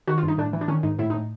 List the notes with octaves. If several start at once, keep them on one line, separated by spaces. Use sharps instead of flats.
D#3 F#4
F4
G2
D#4
A2 D4
E3
D4
D#3 C#4
G#2 D#4
A2 E4
A2 D#4